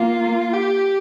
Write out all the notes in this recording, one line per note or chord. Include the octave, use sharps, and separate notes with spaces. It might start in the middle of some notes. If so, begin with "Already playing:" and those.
Already playing: A#3 F4
G4